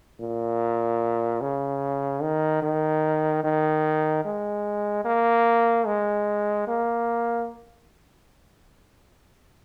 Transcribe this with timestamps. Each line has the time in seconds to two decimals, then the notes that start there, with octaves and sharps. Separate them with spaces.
0.20 A#2
1.41 C#3
2.22 D#3
2.62 D#3
3.44 D#3
4.25 G#3
5.05 A#3
5.86 G#3
6.67 A#3